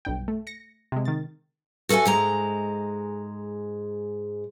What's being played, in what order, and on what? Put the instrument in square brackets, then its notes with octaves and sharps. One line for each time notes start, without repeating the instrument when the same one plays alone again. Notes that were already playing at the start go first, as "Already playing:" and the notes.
[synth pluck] B1 G2 G5
A3
A#6 C#7
C3 G#3
D#3 A6
[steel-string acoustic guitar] F#4 A4 A#4 E5 G#5
G#2 G#3 A#5